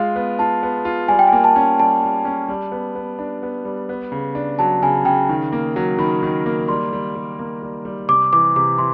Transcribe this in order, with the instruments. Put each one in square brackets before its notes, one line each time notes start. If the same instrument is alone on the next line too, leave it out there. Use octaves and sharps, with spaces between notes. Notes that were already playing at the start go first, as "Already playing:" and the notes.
Already playing: [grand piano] G#3 F4 [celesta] F5
[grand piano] B3
[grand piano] F4 [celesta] A5
[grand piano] B3
F4
[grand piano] G3 [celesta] G#5
[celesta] G5
G#5
[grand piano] A#3
[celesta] A5
[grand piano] C#4
[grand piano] G3 [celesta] A5
[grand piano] G3
C#4
G3
B3
B3
D4
B3
G3
B3
C#3
D4
[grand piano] F#3 [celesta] A5
[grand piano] C#3 [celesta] G#5
[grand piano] C#3 [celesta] G5
[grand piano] D#3
A#3
F#3
[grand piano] D#3 [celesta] B5
[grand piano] D#3
A#3
[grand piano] G3 [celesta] C6
[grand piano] G3
G3
A#3
G3
G3
[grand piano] C3 [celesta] D6
[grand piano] E3 [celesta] D6
[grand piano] C3 [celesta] D6
[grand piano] E3 [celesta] C6